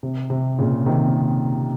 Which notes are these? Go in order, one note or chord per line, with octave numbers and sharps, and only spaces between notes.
C3
C3
A#2 C#3
C3 D#3